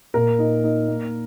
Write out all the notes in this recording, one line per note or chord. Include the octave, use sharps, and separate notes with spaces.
A#2 A#4
D#4
D#4
A#3